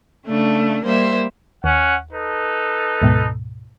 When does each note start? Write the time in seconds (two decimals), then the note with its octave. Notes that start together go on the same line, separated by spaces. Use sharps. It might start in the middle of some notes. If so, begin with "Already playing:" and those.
0.25 C#3 A3 D4
0.84 G3 A#3 C5 E5
1.64 D#2 C#4 F#5
2.12 D#4 A4 B4
3.02 D2 G#2 B2